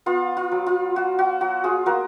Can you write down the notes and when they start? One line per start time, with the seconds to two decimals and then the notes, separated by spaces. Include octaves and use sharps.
0.06 B3 F4
0.37 F4
0.52 F#3
0.66 F4
0.96 F4 F#4
1.19 F#4
1.41 F#3 F#4
1.64 F4 G#4
1.86 A#3 F#4 A#4